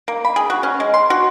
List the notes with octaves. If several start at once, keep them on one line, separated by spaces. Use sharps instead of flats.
A#3
B5
G#4
F#4
C#4
G#3
C6
F#4